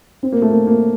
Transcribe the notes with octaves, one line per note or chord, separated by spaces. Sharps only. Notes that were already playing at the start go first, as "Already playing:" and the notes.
C4
A#3
A3
A#3
A#3